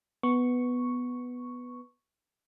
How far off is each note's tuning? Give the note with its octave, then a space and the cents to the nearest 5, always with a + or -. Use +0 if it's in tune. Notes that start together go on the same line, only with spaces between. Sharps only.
B3 +0 C#6 +0